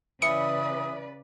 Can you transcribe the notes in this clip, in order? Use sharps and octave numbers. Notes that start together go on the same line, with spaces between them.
C#3 E3 B4 D5 D#6 C#7